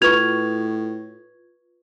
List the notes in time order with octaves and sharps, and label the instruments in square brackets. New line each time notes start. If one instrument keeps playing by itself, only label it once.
[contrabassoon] A2 [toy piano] F4 B4 C#6 [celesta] G#6 F7